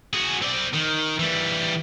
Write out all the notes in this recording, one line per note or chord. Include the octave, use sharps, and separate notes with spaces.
F#4 G#4
C4 D5
D#3
E3 G3